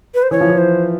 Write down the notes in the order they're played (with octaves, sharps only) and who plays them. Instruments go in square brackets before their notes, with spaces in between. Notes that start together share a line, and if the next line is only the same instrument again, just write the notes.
[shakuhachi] B4
C5
[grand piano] E3 [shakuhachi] C#5
[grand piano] F3
E3
[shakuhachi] C5